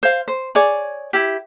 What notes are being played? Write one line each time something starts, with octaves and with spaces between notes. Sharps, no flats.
C5 F5
C5
G#4 C#5 D5
E4 G4